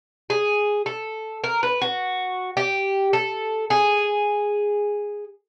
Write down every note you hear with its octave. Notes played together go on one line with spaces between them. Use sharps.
G#4
A4
A#4
B4
F#4
G4
A4
G#4